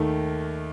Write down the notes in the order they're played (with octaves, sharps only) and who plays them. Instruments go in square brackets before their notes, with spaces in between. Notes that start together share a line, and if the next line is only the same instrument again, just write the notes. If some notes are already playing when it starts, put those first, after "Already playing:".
Already playing: [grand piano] D#2 D#3 A3